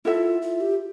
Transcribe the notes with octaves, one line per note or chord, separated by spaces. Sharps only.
E4 F4 A4 E5
F4
G4